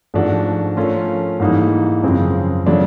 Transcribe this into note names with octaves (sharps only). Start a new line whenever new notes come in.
G#2 F3 A3 D4 F#4
F3 A3 C#4 F4 A#4
G#2 E3 G3 A#3 D#4
F#2 C#3 F3 G#3 C4
C#3 F#3 A3 D4 F4